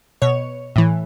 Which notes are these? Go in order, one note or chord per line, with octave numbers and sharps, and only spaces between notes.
B2 C#5
A2 E3